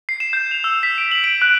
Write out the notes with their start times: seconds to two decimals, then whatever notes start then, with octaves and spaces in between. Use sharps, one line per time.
0.09 C7
0.20 E7
0.33 G6
0.51 F7
0.64 E6
0.83 B6
0.98 D7
1.12 F#7
1.24 D7
1.42 F#6